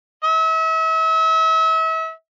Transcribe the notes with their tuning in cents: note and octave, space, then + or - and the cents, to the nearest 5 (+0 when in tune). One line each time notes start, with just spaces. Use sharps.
E5 -35